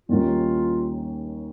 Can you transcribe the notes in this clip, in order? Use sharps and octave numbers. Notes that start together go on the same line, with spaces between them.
D#2 D#3 G3 A#3 C#4 F4